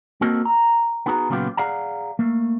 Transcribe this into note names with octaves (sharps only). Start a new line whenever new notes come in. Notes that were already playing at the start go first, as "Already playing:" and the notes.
A#3 C4 F#4 A4 A#4 D#5
A#5
B3 D#4 F#4 G#4 A#5
A#2 C#3 F#3 B3 F4 G4
G#4 D5 F5 F#5 A#5
A3 A#3